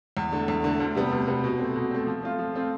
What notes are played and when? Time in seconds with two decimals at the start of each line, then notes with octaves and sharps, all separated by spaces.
0.17 E2
0.32 D3 A3
0.48 E2
0.64 D3 A3
0.80 D2
0.95 C3 G3 B3
1.11 D2
1.27 C3 G3 B3
1.44 B2
1.59 A3 C4
1.76 B2
1.91 A3 C4
2.06 F3
2.23 A3 C4 F4
2.39 F3
2.54 A3 C4 F4